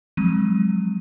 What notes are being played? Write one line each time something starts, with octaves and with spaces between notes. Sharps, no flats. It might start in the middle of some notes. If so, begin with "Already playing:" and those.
F3 F#3 G#3 C4 D#7